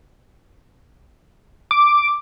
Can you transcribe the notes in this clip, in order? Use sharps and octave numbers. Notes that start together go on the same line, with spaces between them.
D6